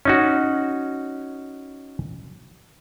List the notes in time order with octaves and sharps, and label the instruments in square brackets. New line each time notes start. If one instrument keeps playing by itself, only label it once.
[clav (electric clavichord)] C#4 D#4 F#4